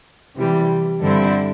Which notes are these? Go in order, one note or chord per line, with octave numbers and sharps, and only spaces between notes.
C3 E3 G3
G2 D3 G3 C4 E4